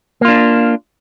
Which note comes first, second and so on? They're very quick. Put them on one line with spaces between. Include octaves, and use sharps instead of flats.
A#3 F4 D4